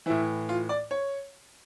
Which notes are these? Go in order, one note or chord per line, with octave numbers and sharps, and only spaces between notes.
A2 E3 E4
F4
D5
C#5